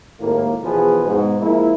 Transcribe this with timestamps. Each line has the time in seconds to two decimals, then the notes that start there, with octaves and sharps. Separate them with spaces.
0.20 G#1 D#2 A2 A#3
0.63 E2 B2 F3 G#4 B4
1.07 G#2 B2
1.41 F3 G#3 A#3 E4